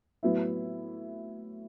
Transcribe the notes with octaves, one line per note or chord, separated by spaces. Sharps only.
A2 F#3 B3 E4